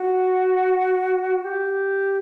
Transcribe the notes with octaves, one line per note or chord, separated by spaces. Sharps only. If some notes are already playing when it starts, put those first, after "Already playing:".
Already playing: F#4
G4